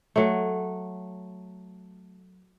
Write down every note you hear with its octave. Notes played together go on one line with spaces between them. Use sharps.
F#3 A3